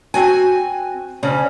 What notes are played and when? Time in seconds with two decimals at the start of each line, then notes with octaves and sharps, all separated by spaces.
0.14 C4 F#4 G#5
1.23 D2 C#3 C#4